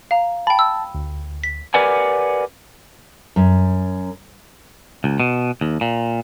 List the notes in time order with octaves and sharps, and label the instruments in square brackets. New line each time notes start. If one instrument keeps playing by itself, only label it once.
[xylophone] F5 A#5
[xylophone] G5 B5 [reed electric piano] A5
[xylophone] E6
[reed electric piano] D2
[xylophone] B6
[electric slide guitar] G4 A#4 B4 D5 F#5 G#5
[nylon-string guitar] F#2
[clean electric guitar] C#2
B2
D#2
A#2